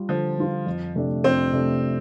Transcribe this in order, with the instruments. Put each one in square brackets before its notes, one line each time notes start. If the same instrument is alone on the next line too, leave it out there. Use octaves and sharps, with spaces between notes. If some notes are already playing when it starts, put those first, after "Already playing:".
Already playing: [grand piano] G3 F4
[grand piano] D3 [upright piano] F3
[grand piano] G3 F4
F2
C3 A3 D4
[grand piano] F2 [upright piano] C4
[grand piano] C3 A3 D4